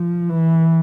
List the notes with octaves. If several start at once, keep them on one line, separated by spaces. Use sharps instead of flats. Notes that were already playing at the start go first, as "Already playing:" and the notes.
Already playing: F3
E3